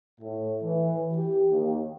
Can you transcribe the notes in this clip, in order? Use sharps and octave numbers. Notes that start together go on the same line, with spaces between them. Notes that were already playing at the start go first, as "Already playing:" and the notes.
A2
E3
G4
D#2